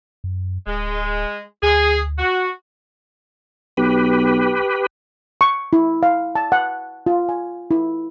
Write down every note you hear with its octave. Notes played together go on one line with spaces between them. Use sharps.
F#2
D1 G#3
D2 G#4
F#4
B1 G4 B4
C#6
E4
F5
A5
F#5
F4
G#5
E4